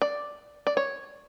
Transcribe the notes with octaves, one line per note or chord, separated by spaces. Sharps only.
D5
D5
C#5